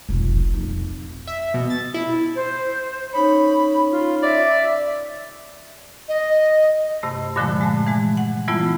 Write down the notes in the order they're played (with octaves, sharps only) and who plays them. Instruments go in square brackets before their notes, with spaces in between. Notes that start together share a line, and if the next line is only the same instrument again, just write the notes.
[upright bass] F1 B1
F2 D#4
[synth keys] E5
B2
A6
E4
[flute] C5
[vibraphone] C#4 D#4 C#5 [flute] B5
[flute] F4
[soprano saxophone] D5 [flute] E5
[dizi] D#5
[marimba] G2 C3 A3
G2 A#2 D3 F3 G#3 A3
G#3 A3
E3 G#3
F#5
E3 G3 A3 B3 E4 F4